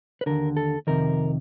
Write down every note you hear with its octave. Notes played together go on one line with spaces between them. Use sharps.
B4
D#2 D3 A#4
A4
F2 C3 D#3 A#4